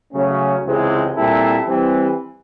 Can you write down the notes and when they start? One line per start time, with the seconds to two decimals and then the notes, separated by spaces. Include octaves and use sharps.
0.12 C#3 F#3 A3 C#4
0.64 C#2 C3 E3 G#3 C4
1.15 A#2 G3 C4 E4 A4
1.65 E3 G3 C4